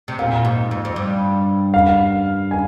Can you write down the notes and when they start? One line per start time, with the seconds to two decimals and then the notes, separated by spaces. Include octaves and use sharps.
0.08 C3
0.19 A#2 F5
0.45 G#2
0.71 F2
0.85 F2
0.96 G2
1.74 F5
2.51 G#5